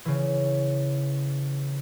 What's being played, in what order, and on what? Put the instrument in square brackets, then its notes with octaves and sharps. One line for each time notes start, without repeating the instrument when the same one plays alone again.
[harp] C#3 E3